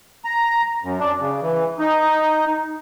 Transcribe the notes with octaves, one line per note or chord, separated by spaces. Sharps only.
A#5
F#2
D4
C#3
E3
D#4